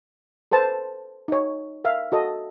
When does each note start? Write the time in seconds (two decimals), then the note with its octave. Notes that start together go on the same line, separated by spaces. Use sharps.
0.51 A4 B4 C5 A5
1.28 D#4 C#5
1.84 A#4 E5 F5
2.12 F#4 A4 D#5